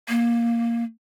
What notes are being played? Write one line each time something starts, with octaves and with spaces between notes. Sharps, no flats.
A#3